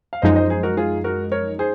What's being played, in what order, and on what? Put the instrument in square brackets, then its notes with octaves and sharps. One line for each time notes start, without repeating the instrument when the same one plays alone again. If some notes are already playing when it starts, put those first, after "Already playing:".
[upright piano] F5
[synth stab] F#2 F3 G#3 D#4 [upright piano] C5 D#5
[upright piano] C5 D#5
G#4 C5
F#4 A#4
F4 G#4
F#4 A#4
A#4 C#5
G#4 C5